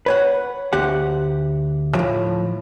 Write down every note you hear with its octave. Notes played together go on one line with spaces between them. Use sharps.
B4 C#5 F#5
D2 G4 F#5
A2 F3